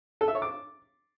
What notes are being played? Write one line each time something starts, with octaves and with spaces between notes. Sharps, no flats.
A4
E5
C#5
D6